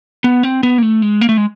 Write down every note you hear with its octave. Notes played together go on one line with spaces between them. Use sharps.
B3
C4
B3
A#3
A3
G#3
A#3
A3
G#3